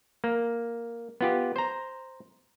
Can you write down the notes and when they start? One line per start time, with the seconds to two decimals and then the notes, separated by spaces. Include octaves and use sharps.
0.24 A#3
1.21 B3 F4 G4
1.56 C5 A#5